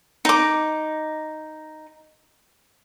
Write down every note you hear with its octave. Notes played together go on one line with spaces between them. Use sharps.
D#4 D6